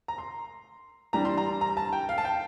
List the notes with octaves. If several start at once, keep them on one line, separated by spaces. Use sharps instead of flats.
A#5
C6
E3 G3 D4 A#5
C6
A#5
A#5
A5
G5
F5
A5
G5